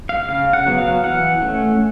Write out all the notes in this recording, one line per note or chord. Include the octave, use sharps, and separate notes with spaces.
F5
C#3 F5
F#5
F#3 B3
F5
E3 F#5
A3 C#4